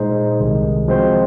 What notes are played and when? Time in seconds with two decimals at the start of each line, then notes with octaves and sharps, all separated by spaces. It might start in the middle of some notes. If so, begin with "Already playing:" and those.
Already playing: A#2 G#3 D#4 G#4 C5
0.40 C2 C3 D#3 G#3
0.88 F3 G#3 C4 F#4 C5